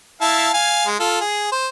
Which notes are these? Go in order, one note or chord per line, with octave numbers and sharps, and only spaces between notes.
E4 F5 A5
F5 G#5
G#3
F4 A4
G#4
C5